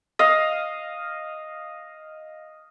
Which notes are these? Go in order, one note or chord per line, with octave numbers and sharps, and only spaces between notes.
D#5 F5